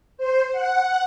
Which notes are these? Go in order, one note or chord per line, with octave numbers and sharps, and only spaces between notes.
C5
F#5